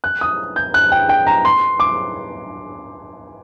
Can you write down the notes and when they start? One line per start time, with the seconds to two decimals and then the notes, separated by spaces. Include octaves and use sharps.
0.04 F#6
0.21 D#6
0.56 G6
0.74 F#6
0.92 G5
1.09 G5
1.27 A#5
1.45 C6
1.80 D6